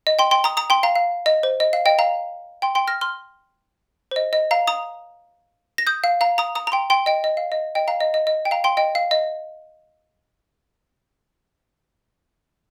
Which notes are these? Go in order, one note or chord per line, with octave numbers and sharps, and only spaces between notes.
D#5
G5 C6
G5 C6
A#5 D#6
A#5 D#6
G5 C6
F5 A#5
F5
D#5
C5
D#5
F5
D#5 G5
F5 A#5
G5 C6
G5 C6
F6 A#6
C6 F6
C5
D#5
D#5
F5 A#5
A#5 D#6
A#6
D#6 G6
F5
F5 A#5
A#5 D#6
A#5 D#6
A#5
G5 C6
G5 C6
D#5 G5
D#5
F5
D#5
D#5 G5
F5 A#5
D#5
D#5
D#5
G5
F5 A#5
G5 C6
D#5 G5
F5
D#5